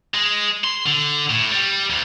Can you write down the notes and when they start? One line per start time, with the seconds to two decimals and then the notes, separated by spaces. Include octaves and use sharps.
0.14 G#3
0.64 C6
0.86 D3
1.30 A2
1.52 G3
1.90 D2